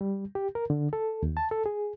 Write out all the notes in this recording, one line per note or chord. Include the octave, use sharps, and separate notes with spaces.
G3
G4
A#4
D3
A4
D#2
A5
A4
G#4